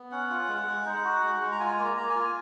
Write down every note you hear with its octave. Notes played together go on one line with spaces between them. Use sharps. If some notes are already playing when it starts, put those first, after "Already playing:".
Already playing: B3
C#4 F#5
F4
G#3
G#3
D#4
F#4
G#3
G#3
A#5
F4 G#5
A#3
A#5
A#3 A#5
G#5
F4